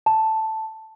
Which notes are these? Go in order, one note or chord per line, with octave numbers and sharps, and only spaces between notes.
A5